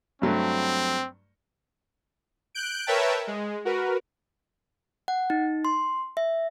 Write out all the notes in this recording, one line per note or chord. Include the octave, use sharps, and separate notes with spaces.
G2 F#3 A3 C4
F#6 G6 D7
A#4 B4 C#5 E5 G5 A5
G#3
F#4 A#4 B4
F#5
D#4
C6
E5